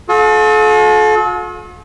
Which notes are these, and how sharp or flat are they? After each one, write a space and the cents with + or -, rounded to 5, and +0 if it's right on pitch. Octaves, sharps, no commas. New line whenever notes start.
F4 +45 A4 -40